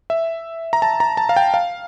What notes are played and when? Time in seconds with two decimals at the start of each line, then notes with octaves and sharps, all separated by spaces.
0.10 E5
0.73 A#5
0.82 A5
1.00 A#5
1.17 A5
1.29 F5
1.37 G5
1.54 F5